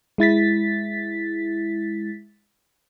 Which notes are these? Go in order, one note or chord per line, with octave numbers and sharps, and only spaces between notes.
G#3 E4 A6 B6